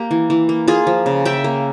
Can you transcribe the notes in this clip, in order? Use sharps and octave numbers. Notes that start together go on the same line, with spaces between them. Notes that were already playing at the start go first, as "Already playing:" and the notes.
Already playing: A#3 G4
E3
E3
A#3
A#3 F4 G#4
F3
C#3
C#3 E5 G5
A#3